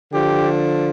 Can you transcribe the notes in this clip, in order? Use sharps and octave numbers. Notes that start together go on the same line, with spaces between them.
D3 F3 G4